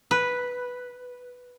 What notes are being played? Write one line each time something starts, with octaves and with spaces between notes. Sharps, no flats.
B4